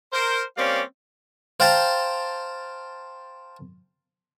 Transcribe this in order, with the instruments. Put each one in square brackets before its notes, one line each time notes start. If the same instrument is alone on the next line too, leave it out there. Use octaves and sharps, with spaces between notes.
[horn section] A#4 C5
G3 A#3 C4 C#4 D5 F5
[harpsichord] C5 F5 G5 A5 A#5 C6